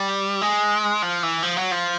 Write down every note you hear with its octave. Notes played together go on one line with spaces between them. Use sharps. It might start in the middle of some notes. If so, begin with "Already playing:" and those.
Already playing: G3
G#3
F3
E3
F3
F#3
F3